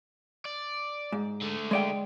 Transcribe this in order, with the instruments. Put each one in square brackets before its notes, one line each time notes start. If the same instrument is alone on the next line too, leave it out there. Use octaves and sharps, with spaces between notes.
[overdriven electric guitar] D5
[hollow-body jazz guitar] G#2
[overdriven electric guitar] D3 A3
[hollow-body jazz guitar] G#3 D5 G5